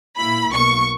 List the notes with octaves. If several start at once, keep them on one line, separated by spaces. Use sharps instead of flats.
A#2 A#3 E4 B5
B1 B2 A#3 C#6